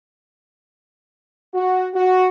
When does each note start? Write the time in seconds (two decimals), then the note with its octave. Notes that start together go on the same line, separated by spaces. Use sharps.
1.54 F#4
1.94 F#4